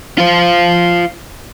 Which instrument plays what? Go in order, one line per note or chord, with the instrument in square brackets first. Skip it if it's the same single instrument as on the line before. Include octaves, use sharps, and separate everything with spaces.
[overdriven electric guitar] F4 C5